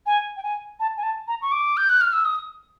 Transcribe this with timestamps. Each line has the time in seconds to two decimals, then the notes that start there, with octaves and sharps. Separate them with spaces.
0.06 G#5
0.37 G5
0.43 G#5
0.80 A5
0.97 G#5
1.03 A5
1.28 A#5
1.42 C#6
1.52 D6
1.77 G6
1.89 F#6
2.01 F6
2.13 E6
2.25 D#6